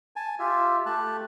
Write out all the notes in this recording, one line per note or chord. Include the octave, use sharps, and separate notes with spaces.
G#5 A5
F4 G4 E5
A3 G4 A5 F#6